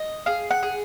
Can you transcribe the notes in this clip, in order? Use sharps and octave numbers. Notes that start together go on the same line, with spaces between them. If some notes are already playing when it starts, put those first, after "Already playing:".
Already playing: D#5
G#4 F5
F#5
G#4